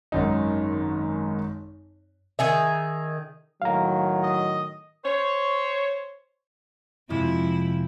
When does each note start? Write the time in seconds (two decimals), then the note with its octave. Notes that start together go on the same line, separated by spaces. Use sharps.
0.12 G#1 F#2 D#4
2.39 D#3 G#4 E5
3.62 A2 D#3 F#3 F5 A#5
4.23 D#5
5.05 C5 C#5
7.10 F2 C3 F3 G#3 C4 E4